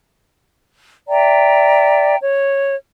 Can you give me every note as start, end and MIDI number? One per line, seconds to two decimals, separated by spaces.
1.08 2.17 74
1.08 2.17 76
1.08 2.17 79
1.08 2.17 82
2.22 2.76 73